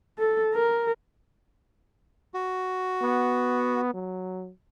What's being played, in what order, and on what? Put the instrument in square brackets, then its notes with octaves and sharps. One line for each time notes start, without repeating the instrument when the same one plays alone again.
[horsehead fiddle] A4
A#4
[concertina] F#4
[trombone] B3
F#3